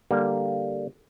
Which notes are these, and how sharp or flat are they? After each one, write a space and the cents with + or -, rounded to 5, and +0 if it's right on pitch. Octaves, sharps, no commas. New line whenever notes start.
D3 +0 G3 +0 A#3 +0